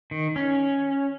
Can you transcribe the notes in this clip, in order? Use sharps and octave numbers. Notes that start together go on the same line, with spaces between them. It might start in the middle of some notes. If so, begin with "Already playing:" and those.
D#3
C#4